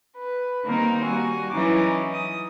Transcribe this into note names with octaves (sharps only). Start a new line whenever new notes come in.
B4
D#3 G3 A#3 C4 D#4 A#4
G3 F#4 G#5
E3 F#3 C#4 D#4 D6
D#6